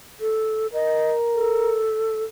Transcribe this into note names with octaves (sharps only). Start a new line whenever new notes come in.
A4
A#4 D#5
A4